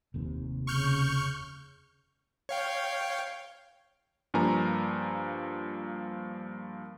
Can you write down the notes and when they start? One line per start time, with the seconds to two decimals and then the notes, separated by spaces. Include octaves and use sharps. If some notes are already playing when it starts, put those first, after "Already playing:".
0.14 F1 D#2 C3
0.67 C#3 C#6 F6 G6
2.49 C#5 F5 G5
4.34 G2 F3 A#3 G#5 A#5